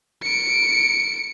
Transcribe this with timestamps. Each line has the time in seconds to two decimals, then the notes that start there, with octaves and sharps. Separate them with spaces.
0.23 C#7 D7